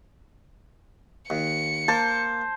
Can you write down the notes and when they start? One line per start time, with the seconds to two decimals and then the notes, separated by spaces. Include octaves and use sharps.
1.30 D#2 C#7
1.88 A#3 C5 A5